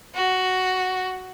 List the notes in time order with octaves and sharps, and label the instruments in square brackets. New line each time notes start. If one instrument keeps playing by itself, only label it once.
[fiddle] F#4